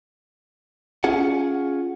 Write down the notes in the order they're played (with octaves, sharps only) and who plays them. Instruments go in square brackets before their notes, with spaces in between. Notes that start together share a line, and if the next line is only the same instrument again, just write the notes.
[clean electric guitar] C#4 F4 G#4 F#5